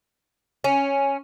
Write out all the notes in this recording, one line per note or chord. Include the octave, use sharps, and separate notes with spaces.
C#4